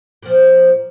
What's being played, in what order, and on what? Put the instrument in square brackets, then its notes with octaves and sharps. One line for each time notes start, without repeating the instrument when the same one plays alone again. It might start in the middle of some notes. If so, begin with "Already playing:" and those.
[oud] A#2 F3